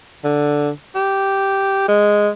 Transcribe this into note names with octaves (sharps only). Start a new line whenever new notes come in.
D3
G4
G#3